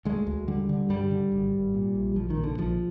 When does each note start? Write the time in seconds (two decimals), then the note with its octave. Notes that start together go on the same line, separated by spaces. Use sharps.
0.05 D2 G#3
0.27 D2
0.48 D3 G3
0.69 D3
0.90 G2 G3
1.11 D3
1.32 G#1
1.53 G#1
1.74 A#2
1.95 A#1
2.16 A#1 F3
2.30 D#3
2.37 A#2
2.44 D3
2.58 A#1 F3